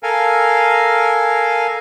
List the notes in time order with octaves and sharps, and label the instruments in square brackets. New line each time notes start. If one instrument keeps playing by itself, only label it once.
[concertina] A4 A#4 F5 G#5